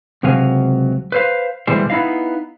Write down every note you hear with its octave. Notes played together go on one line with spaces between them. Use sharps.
C#2 C3 F#3 F#4 F5 G#5
B4 C5 F5
D2 B2 E3 G3 G#3 C5
B3 D#4 E4 D#5 F5